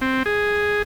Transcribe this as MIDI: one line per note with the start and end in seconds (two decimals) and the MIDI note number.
0.02 0.23 60
0.26 0.82 68